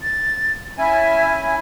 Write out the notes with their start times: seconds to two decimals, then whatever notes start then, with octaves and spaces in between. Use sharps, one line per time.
0.01 A6
0.78 C#4 E4 E5 G#5